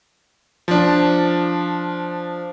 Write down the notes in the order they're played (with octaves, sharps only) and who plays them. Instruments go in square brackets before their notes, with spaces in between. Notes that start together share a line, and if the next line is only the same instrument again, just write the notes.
[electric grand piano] F3 D4